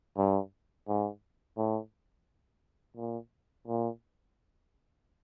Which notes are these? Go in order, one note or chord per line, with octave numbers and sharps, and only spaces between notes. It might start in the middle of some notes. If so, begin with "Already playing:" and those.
G2
G#2
A2
A#2
A#2